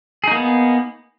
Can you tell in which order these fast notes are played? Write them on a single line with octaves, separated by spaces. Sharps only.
G#4 D#4 A#3 B3